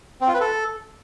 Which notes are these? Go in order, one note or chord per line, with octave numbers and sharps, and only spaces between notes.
C4
F4
B4
A4